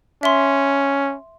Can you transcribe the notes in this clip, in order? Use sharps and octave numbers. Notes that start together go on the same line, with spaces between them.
C#4 E5 C6